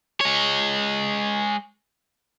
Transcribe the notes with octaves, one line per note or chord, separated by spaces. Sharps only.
G#3 C#5